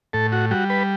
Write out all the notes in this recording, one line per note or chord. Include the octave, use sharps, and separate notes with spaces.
A2 A4
F#4
G3 F#4
B4